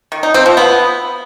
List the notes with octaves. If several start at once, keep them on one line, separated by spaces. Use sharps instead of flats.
D#3
D#4
C4
F3
B3